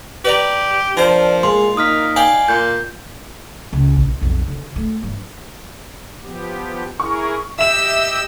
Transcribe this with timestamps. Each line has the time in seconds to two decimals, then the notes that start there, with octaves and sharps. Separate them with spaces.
0.25 G4 B4 D5 A#5
0.97 F3 D4 A#4 C5
1.43 A#2 G#3 C6
1.77 A#3 D#4 D#6 F6 B6
2.16 D5 F5 G5 G#5
2.48 A#2 G6
3.73 C#2
3.95 A#1
4.21 B1 F2
4.48 D3
4.76 A3
5.03 G2 E3
6.23 F3 B3 G4
7.00 E4 G#4 A#4 C#6
7.59 G4 D#5 E5 G5 E6 E7